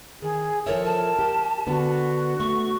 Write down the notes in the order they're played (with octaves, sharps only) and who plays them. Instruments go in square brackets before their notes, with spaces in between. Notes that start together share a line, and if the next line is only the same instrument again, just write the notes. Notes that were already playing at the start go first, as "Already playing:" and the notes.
[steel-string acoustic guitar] D#3 [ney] G#4
[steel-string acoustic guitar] F3 A4 E5 [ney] A#4 [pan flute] C#5
[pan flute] A5
[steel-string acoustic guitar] G4
[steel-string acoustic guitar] D3 B3 [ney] F#4
[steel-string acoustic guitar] A3 [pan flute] C#6